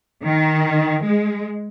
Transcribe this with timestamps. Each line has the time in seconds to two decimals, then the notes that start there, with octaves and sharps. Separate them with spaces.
0.25 D#3
1.02 G#3